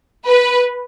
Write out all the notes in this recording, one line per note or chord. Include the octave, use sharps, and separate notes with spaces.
B4